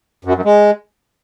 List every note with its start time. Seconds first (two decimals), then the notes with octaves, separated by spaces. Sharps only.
0.25 F#2
0.35 F#2
0.45 G#3